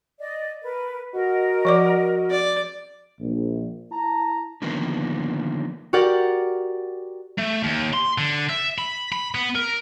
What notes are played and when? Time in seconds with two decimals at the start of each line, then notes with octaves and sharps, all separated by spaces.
0.20 D5 D#5
0.62 A#4 B4
1.13 F#4 A#4 D#5
1.65 F3 D5 D6
2.31 D5
3.20 A#1
3.90 E4 A5 A#5
4.62 D3 D#3 F3 A#3 B3
5.93 F#4 G4 A#4 D5 F#5
7.39 A3
7.64 D#2
7.94 C6
8.18 D3
8.49 E5
8.78 B5
9.12 B5
9.35 B3
9.55 A#4